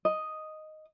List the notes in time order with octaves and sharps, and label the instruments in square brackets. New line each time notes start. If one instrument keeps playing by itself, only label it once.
[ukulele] D#5